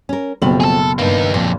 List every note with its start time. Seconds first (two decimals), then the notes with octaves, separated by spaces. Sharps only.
0.09 C#4 A#4
0.42 F#1 B2 F3 A3 C4 F#7
0.60 G#4 A4
0.99 G2 A#3 D#4
1.34 F2 A#2